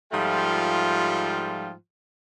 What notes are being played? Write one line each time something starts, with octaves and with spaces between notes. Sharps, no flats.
G#2 F3 G3 A3 F4 G5